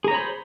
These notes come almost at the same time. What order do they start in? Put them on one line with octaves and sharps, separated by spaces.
G#4 A#5 C#5 B5 C5